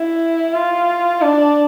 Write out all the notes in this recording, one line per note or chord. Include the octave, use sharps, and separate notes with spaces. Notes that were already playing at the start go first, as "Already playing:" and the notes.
Already playing: E4
F4
D4